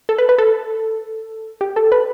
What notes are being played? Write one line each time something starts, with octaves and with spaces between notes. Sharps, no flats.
A4
B4
B4
A4
G4
A4
B4